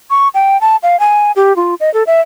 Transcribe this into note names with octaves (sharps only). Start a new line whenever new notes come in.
C#6
G5
A5
F5
G#5
G4
F4
D#5
A4
E5